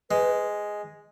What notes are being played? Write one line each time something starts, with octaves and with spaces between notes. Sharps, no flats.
G#3 B4